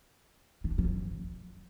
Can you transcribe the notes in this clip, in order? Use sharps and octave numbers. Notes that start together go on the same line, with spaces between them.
D#3
F3